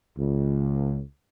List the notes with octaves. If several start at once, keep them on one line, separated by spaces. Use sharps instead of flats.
C#2